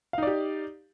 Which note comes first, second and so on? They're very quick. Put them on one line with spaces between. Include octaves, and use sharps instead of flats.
F5 D#4 D5 G4